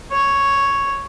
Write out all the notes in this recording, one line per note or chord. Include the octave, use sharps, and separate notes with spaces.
C#5